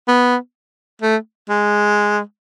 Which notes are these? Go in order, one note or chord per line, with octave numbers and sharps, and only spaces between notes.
B3
A3
G#3